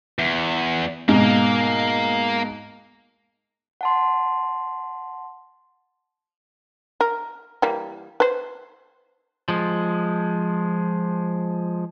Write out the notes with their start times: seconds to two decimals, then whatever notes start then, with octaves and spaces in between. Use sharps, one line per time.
0.19 E2
1.08 G#2 B2 A#3 A#4
3.81 F#5 A5 C6
7.01 A#4
7.62 E3 G3 A#3
8.20 B4 C5
9.48 F3 G#3